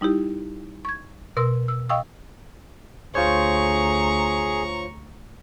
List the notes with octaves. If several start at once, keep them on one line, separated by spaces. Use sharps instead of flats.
G3 D#4 E4 G4
C#6 G#6
B2 A#4 C6 E6
E6
D#5 F5 G5 C#6 D#6 E6
D2 F4 G#4 C5 C#5 A#5 C#6